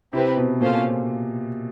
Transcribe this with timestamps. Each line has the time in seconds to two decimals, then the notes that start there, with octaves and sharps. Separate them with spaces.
0.13 C3 C4 E4 G4 B4
0.37 B2
0.61 A#2 C#4 F4 A4 C5 F5